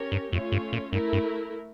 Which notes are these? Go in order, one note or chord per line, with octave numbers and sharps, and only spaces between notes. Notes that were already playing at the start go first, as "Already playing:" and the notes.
Already playing: C#4 G4 A#4 C#5
G2
F2 A3 C#4 F4 C#5
G2
A#2
G2 A3 E4 A#4
G2